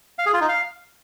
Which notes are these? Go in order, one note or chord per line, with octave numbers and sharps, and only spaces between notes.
F5
G#4
F4
D#4
F5